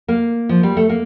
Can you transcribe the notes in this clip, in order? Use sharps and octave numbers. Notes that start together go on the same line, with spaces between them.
A#3
F3
G3
A3
A#3